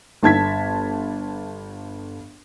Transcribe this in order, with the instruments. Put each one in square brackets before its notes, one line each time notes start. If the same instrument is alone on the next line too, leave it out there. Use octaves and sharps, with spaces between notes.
[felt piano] G1 A5 G#6 B6